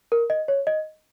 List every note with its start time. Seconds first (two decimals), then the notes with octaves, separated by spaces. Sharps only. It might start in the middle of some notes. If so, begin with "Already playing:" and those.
0.12 A#4
0.30 D#5
0.48 C#5
0.67 D#5